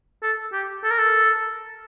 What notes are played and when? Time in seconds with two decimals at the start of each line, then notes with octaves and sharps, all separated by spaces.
0.23 A4
0.53 G4
0.84 A4
0.91 A#4
0.99 A4